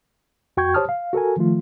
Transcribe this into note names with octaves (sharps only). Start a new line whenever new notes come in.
F2 F#4 G5 C#6 G6 G#6
G4 C5 C#5 A5 D#6 F6
F5
F#4 A4 A#4 G#5
D#3 F3 A3 F4